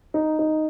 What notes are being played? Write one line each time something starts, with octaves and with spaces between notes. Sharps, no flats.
D#4
D#4